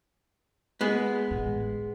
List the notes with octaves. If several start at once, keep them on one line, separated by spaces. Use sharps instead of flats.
G#3 B3
A1 G3